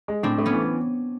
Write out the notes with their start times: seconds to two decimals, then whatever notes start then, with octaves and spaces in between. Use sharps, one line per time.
0.08 G#3
0.23 A2 C4 D4
0.38 A3
0.46 B3 C#4
0.53 E3